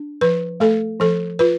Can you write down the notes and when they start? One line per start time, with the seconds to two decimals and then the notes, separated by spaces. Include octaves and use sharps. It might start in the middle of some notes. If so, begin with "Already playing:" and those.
Already playing: D4
0.21 F3 B4
0.60 A3 A4
1.00 F3 A4
1.39 F4 B4